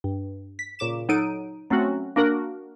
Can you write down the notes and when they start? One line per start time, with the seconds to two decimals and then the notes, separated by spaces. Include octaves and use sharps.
0.04 G2
0.59 B6
0.79 A#2 C#3 D6 E7
1.09 F#3 D#4 A4 D7 D#7
1.70 F#3 A3 C4 C#4 F#4
2.16 A#3 D4 F#4 A#4